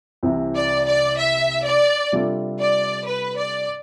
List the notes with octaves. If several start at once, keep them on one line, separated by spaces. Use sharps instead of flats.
C2 C3 E3
D5
D5
E5
D5
C3 G3 D4 F4 A4
D5
B4
D5